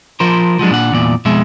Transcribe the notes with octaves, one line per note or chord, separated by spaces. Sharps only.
F3 A#4 C5
F3 F#3 G#3 D4
A#2 D4 F#5
E2 A#2 D5
F2 B2 G#3 E5